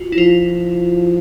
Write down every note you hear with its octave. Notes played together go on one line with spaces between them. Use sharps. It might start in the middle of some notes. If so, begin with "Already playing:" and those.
Already playing: F4 F#4
E4
F3 F4